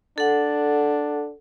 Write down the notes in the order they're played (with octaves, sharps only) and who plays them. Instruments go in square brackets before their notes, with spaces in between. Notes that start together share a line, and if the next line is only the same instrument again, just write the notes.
[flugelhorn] D4 [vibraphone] A4 F#5